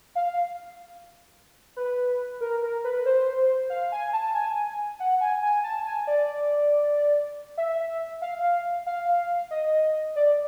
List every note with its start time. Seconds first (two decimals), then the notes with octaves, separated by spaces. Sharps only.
0.15 F5
1.76 B4
2.41 A#4
2.62 A#4
2.84 B4
3.06 C5
3.70 F5
3.92 G#5
4.13 A5
4.34 G#5
5.00 F#5
5.21 G#5
5.43 G#5
5.64 A5
5.86 G#5
6.07 D5
7.58 E5
8.22 F5
8.86 F5
9.51 D#5
10.16 D5